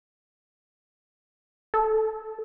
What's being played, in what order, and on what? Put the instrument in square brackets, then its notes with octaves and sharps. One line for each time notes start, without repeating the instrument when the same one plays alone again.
[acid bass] A4